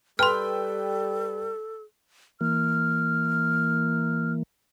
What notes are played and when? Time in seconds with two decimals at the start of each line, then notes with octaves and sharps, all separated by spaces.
0.19 G3 A4 B4 G5 C6 F6
2.41 E3 A#3 F6